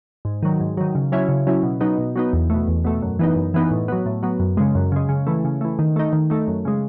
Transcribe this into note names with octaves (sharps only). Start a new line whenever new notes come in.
G#2
D#3 F#3
G#2
D#3 F#3
C#3
F#3 C#4 E4
C#3
F#3 C#4 E4
B2
F#3 B3 D#4
B2
F#3 B3 D#4
E2
B2 A3
E2
B2 A3
F#2
E3 B3 D#4
F#2
E3 B3 D#4
A2
F#3 B3
A2
F#3 B3
F#2
C#3 G#3
F#2
C#3 G#3
C#3
E3 A3
C#3
E3 A3
D#3
A3 D#4
D#3
A3 D#4
F#2
C#3 G#3